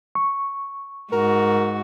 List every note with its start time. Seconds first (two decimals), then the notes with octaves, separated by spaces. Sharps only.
0.15 C#6
1.12 G#2 F#4 A#4